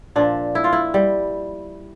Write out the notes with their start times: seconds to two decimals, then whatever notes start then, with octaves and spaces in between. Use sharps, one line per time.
0.16 A#2 F3 D4
0.55 E4
0.64 F4
0.73 E4
0.94 G3